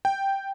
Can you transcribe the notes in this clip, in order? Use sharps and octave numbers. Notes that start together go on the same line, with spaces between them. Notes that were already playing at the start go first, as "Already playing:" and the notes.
G5